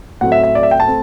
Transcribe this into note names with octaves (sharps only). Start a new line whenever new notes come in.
A2 F#3 A3 C4 F#5
E5
E5
D5
E5
G5
A5
A3 C4